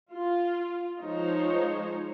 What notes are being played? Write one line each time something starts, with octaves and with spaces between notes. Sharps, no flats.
F4
F3 G#3 D#4 C5 C#5